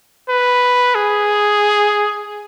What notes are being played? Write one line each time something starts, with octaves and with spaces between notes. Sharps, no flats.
B4
G#4